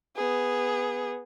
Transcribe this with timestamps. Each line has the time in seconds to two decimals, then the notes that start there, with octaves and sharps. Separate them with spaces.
0.16 B3 G#4